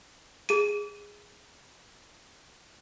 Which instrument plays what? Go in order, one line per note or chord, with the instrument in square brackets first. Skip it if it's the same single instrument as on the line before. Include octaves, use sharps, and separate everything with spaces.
[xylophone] G#4 D#7